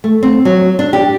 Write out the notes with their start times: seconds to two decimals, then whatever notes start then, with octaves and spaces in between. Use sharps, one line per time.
0.04 A3
0.23 C4
0.45 F#3
0.79 D4
0.93 G4